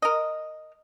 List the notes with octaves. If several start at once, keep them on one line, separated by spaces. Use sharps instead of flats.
A#4 D#5